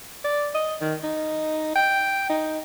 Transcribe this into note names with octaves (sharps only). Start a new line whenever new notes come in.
D5
D#5
D#3
D#4
G5
D#4